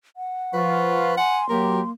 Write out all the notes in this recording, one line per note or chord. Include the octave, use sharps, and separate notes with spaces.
F#5
F3 F4 B4 C#6
F#5 G#5 C6
F#3 A#3 G4 A#4